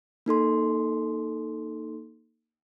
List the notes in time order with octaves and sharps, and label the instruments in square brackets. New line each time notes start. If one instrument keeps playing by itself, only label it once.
[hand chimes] A#3 D#4 A4 C6